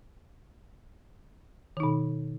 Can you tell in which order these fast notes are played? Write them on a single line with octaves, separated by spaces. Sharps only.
D#3 D#4 B2